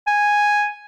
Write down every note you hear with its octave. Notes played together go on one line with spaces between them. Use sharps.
G#5